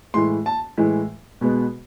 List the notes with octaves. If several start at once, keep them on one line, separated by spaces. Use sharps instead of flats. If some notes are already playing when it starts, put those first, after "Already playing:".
A2 E3 G#3 C6
A5
A2 E3 G#3
B2 G#3 B3